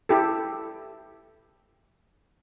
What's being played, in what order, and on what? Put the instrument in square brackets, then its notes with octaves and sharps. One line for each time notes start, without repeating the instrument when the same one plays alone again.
[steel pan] E4 G4 A4